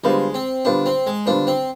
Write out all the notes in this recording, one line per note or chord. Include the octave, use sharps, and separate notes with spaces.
D3 G3 G#3 B3 F4 C5
C4
D3 G3 B3 D4 F4 C5
C4
G#3
D3 G3 B3 D4 F4 C5
C4